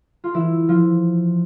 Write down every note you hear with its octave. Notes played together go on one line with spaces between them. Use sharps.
F4
E3 E4
F3 F4